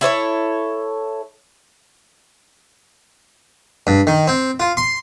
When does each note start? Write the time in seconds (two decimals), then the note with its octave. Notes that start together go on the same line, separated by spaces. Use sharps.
0.01 E4 A4 C5 C#5
3.87 G2
4.07 D#3
4.27 C4
4.60 F4
4.77 C6